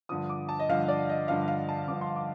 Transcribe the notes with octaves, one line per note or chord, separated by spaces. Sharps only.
G2 D3 F3 D#6
D6
A5
D#5
G2 D3 F3 F5
D5
D#5
G2 D3 F3 F5
F5
A5
G2 D3 F3 D6
C6
D6